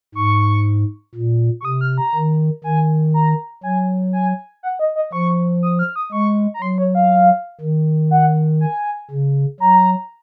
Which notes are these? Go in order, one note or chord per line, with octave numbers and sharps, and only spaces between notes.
G#2 C#6
A#2
C#6
C3 D#6
F6
A#5
D#3
D#3 G#5
A#5
F#3 G#5
G#5
F#5
D#5
D#5
F3 C#6
D#6
F6
D#6
G#3 C#6
A#5
F#3 C6
C#5
F5
D#3
F#5
G#5
C#3
F#3 A#5